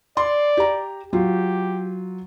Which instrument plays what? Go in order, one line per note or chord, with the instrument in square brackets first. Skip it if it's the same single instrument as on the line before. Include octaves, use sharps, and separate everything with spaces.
[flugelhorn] D5 [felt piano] C6
[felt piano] G4 A#5
[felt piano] F#3 F4 [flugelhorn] G4